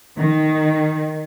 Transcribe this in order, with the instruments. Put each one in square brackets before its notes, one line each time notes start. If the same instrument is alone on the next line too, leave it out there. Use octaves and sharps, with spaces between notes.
[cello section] D#3